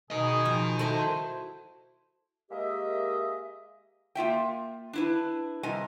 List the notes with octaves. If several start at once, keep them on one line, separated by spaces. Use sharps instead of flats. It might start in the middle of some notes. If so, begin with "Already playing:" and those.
B2 G#4 A#4 D#5
F3
E4 F#4 A4 C5
G#3 A#3 G4 A#4 D#5 E5
A#3 F4 E5 G5
D4 E4 B4
C3 G3 D#5 G#5